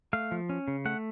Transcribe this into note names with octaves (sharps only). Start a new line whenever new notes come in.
A3 F5
F3
C#4
C#3
A3 F#5